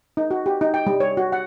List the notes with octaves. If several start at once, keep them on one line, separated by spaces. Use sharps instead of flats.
D#4
F#4
G4
D#4
G5
G3
C#5
F#4
F#5